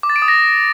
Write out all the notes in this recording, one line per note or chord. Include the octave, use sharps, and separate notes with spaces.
D6
A6
D7
D#6
A#6